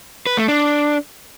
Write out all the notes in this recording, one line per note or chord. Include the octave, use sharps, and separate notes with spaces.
B4
A3
D4